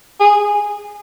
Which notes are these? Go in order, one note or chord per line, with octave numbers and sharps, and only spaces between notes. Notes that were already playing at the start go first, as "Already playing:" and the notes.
G#4